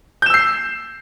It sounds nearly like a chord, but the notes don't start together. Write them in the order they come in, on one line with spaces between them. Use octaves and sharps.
G6 E7 E6 C7